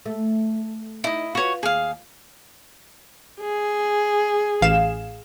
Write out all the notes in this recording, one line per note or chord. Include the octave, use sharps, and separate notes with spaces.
A3
D#4 E4 D#5
F4 F#4 B4 C#5
D#2 G#4 F5
G#4
A1 F5 E7